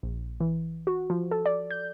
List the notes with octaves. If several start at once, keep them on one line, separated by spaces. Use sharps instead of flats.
A#1
E3
F#4
F3
A4
D5
G6